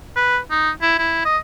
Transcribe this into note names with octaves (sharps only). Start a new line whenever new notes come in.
B4
D#4
E4
E4
D#5